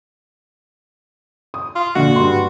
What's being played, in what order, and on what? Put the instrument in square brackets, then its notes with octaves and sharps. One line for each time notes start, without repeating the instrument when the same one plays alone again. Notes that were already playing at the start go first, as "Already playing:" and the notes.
[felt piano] D#6
[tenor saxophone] F4
[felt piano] A#1 D3 [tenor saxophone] F#4
[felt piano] G2 C6